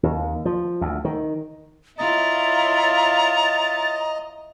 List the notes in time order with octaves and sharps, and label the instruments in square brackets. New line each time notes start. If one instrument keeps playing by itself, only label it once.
[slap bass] D#2
F3
D2
D#3
[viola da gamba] E4 F4 C#5 [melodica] D#5 [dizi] A#5 [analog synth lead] A6